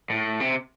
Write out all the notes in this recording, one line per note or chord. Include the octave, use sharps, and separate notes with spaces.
A2
C3